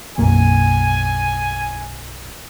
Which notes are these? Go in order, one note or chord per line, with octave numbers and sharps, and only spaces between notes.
B1 F#2 A#3 G#5